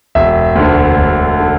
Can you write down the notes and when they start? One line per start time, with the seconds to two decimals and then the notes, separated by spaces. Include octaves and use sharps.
0.15 E1 E5
0.56 D2 D3
0.97 E1
1.40 D3